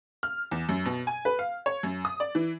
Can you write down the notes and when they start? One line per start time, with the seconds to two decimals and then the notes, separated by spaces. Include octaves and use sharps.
0.23 F6
0.51 E2
0.69 F#2
0.85 B2
1.07 G#5
1.25 B4
1.39 F5
1.66 C#5
1.83 F#2
2.05 D#6
2.20 D5
2.35 E3